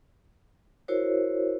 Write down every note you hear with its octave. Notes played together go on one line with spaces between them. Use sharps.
E4 F#4 A#4 C5 C#5